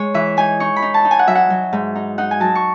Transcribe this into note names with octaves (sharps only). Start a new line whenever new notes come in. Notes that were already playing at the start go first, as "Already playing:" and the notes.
Already playing: G#3 C#5
E3 E5
D#4 G#5
D#4 C#6
B5
D#4
A5
D#4
G#5
F#5
F#3 E5
F#5
F#3
G#2
D#4
D#4 F#5
G#5
F#3 A5
C#6